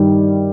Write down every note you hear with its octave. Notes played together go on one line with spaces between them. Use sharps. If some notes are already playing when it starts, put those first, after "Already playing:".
Already playing: G2 D#3 G3